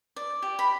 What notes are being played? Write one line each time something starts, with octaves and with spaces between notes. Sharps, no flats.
D5
G4
B5